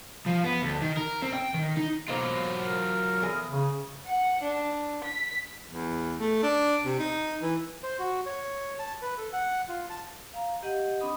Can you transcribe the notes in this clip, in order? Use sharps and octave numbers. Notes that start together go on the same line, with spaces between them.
F3
B3
D2
D#3
A#4
C4
G5
D#3
D#4
B2 F#3 A#3 F4 C5
A#4
E2 G#4
C#3
F#5
D4
B6
E2
A3
D4
C3
D#4
E3
C5
F#4
C#5
A5
B4
A4
F#5
F4
A5
F5 A#5
G4 D#5 F#5
C4 D4 D#5 B5 D#6